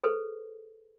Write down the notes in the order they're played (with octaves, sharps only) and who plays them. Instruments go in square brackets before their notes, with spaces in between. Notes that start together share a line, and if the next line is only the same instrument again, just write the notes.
[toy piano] G#4 A4 B4 C5